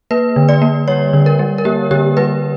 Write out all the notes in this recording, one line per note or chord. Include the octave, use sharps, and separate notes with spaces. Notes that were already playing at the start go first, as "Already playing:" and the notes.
A#3 B4
D3
D5
A#3
G3 C#5
D3
A#4
G3
A#4
A#3 G4
D3 G4
G3 B4